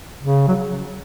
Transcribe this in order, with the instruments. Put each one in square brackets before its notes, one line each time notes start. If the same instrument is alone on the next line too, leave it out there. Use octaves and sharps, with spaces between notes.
[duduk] C#3
F#3